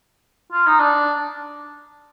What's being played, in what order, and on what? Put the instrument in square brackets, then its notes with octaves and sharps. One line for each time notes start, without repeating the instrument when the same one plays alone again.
[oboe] F4
D#4
D4